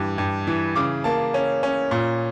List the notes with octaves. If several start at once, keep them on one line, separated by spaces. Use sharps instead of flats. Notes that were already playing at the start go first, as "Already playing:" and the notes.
Already playing: G2 E3
G2
E3
C#3 D6
A#3 A5
C#4
C#4
A#2